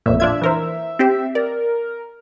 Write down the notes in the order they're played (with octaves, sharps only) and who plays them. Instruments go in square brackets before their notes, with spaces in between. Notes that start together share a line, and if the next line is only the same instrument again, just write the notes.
[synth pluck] A1 F2 A#2 [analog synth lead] E5
[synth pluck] D4 F4 G#6 [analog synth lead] E5
[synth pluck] E3 A#4 C5
C4 G4 C5
[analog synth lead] A#4 [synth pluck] D5